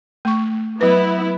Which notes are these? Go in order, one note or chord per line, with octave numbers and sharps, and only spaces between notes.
A3 C#6
F#3 B3 E4 B4